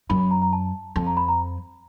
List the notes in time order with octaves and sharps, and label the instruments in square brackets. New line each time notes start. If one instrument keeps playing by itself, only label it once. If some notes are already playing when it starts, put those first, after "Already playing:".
[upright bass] F#2 [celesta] B5
[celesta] B5
A#5
A#5
A5
[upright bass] F2 [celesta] A5
[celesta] A#5
B5
A#5